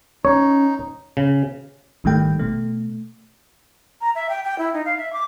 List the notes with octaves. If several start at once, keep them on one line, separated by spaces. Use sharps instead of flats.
C#4 D#4 C#5
C#3
G#1 D#3 G3 A3 G5
B2 A3
A#5
E5
G5
G5
E4
D#4
F5
E5
D6